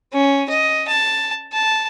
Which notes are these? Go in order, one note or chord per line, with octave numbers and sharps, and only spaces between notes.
C#4
D#5
A5
A5